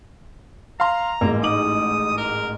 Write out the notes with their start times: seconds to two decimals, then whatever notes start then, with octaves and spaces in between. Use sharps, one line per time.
0.80 F5 A#5 C6
1.21 A1 G#2 A#3
1.43 D#4 D6 D#6 F#7
2.17 A#4